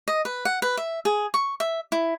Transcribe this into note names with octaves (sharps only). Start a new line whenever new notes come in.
D#5
B4
F#5
B4
E5
G#4
C#6
E5
E4